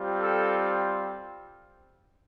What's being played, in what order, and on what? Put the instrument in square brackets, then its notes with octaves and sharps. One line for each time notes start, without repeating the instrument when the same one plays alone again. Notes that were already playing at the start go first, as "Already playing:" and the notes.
Already playing: [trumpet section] G3 C4 F4
A4